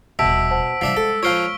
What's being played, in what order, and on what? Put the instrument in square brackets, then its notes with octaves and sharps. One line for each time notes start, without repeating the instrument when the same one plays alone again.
[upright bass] D#1 A#1 [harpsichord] B2 [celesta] E5 A5 [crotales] E6 B6 D7
[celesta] C5 F#5 A5
[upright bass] C3 G3 [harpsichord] F3 D4 E5
[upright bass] G#3 [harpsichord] A4
[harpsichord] F3 C5 C#5 [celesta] F4 F6 [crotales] C#6 D7 G7